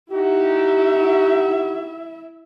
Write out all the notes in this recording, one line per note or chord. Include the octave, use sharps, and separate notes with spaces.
D#4 E4 F#4 G4 E5